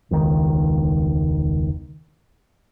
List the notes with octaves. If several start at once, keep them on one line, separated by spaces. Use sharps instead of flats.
E1 C#2 D#3